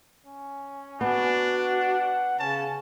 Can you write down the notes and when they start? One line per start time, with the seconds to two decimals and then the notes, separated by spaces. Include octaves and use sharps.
0.26 C#4
1.01 B3 D4 F#4
1.56 F#5
2.39 C#3 C#4 A5